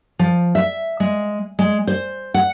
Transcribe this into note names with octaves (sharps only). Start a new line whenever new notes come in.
F3
E5
G#3
G#3
C5
F#5